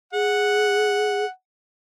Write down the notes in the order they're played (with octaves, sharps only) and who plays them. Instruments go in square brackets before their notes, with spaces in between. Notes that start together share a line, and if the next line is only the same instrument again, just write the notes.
[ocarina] G#4 [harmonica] F#5